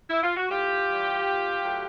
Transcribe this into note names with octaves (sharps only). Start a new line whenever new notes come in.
E4
F4
F#4
A2 F4 G4
E3 G3
A#2
F#3 A3